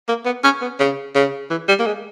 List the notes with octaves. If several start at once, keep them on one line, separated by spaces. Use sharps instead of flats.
A#3
B3
C#4
B3
C#3
C#3
E3
G3
A#3
G#3